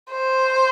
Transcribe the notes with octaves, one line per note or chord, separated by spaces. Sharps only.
C5